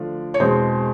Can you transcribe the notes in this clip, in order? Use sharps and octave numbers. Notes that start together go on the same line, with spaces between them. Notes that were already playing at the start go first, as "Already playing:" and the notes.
Already playing: D3 F3 A3 D4
C#5
E2 B2 G#3 C4 C5